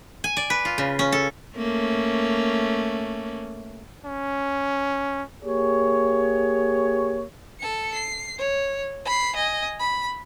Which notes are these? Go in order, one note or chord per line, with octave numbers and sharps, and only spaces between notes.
G#5
D5
B4
F4
C#3
C#4
A4
A3 A#3 C#4
C#4
A#3 G4 G#4 C#5
A4 C#7
C7
C#5
B5 C7
D#5 G#5
B5